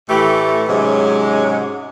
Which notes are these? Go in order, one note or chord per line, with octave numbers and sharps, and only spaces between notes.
A2 E3 A3 G4
G#2 C3 F#3 G#3 C#4